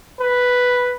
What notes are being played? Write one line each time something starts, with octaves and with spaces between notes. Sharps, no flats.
B4